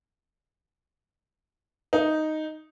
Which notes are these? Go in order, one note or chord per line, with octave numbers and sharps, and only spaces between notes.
D#4